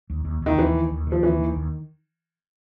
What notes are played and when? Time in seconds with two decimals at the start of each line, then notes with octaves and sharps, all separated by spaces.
0.10 D#2
0.25 D#2
0.42 D#2 D#3
0.57 D#2 E3
0.74 D#3
0.91 D#2
1.07 D#3 F3
1.22 D#2 E3
1.39 D#3
1.56 D#2